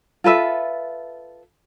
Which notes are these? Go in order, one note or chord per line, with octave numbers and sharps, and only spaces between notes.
F4 A4 B4 E5